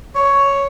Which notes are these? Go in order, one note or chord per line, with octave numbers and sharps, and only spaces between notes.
C#5